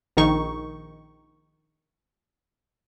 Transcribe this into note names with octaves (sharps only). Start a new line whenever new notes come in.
A#1 D#3 D#4 C#6